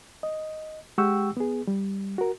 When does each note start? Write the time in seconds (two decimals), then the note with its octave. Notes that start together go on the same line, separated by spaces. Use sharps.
0.23 D#5
0.98 G#3 G4 F#5 G5 C#6 E6
1.37 B3 G#4
1.67 G3
2.18 F#4 A#4